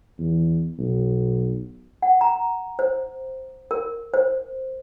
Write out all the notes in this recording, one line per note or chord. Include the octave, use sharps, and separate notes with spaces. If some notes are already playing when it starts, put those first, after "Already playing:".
E2
B1
F#5
A#5
C5
A#4
C5